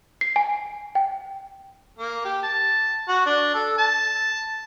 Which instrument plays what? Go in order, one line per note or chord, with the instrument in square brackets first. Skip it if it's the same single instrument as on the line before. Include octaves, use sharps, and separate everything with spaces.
[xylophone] C7
G#5
G5
[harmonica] A#3
G4
A5
F#4
D4
A4
A5